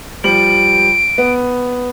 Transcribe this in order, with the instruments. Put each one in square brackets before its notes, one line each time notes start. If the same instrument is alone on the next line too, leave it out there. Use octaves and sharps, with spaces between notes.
[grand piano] F3 G3 F#7 [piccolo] D7
[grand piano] B3